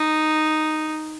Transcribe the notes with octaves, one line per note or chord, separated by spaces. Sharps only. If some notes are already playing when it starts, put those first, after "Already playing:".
Already playing: D#4